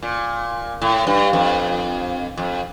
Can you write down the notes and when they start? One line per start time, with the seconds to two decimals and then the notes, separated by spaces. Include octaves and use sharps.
0.03 A#2
0.82 A2
1.07 G2
1.33 F2
2.37 F2